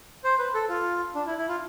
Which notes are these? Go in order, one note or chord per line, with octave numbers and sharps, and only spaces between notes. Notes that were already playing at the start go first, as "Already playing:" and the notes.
C5
B4
A4
F4
D4
E4
E4
F4